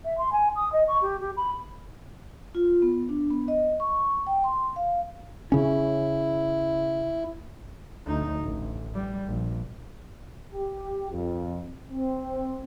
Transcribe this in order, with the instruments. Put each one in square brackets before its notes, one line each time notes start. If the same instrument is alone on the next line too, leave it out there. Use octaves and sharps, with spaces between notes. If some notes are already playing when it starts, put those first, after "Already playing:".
[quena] E5
C6
G#5
D#6
D#5
C#6
G4
G4
B5
[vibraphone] F4
B3
D4
B3
D#5
C#6
G5
C6
F5
[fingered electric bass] C#3 C#4 [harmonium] E4
[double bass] D2 D#4
A1
G3
A#1
[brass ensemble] G4
F2
C4